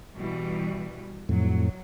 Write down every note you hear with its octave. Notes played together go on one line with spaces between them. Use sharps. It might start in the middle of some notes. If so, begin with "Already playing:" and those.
B2 E3 G3
F2 A2 F#3